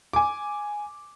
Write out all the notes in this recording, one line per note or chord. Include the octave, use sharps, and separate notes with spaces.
G#5 D6